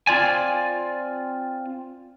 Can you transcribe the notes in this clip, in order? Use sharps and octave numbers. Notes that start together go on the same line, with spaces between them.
C4 F4 D5 G#5